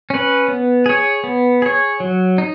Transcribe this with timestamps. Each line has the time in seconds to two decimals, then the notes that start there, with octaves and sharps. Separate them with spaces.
0.10 C#4 B4
0.48 B3
0.86 G#4 C#5
1.24 B3
1.62 G#4 C#5
2.00 F#3
2.38 D#4